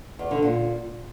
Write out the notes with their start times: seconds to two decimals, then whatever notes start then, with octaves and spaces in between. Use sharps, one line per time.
0.19 E2
0.31 D3
0.42 A#2